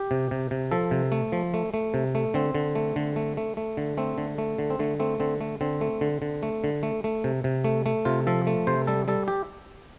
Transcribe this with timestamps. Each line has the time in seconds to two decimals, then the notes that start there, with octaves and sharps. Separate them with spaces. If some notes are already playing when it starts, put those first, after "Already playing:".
Already playing: G4
0.11 C3
0.31 C3
0.51 C3
0.71 F3 A4
0.91 C3
1.12 A3
1.32 F3
1.54 A3
1.74 A3
1.94 C3
2.15 A3
2.34 D3 C4
2.55 D3
2.75 A3
2.96 D3
3.16 A3
3.37 A3
3.57 A3
3.77 D3
3.97 A3 C4
4.18 D3
4.38 A3
4.59 D3
4.70 C4
4.79 D3 A3
5.00 A3 C4
5.20 D3 C4
5.41 A3
5.61 D3 C4
5.81 A3
6.01 D3
6.22 D3
6.43 A3
6.64 D3
6.83 A3
7.04 A3
7.24 C3
7.44 C3
7.65 A3
7.86 A3
8.05 C3 F4
8.27 F3 A4
8.47 A3
8.67 C3 C5
8.87 G3 A4
9.08 G3 A4
9.28 G4